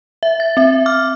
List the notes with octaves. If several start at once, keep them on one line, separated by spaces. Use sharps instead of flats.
E5
A6
C4 E5
D6 F6